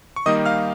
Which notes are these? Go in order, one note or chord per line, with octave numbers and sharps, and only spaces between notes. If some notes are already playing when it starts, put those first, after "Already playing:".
C#6
D#3 G3 A#3 D#4 D#5 D#6
F5 F6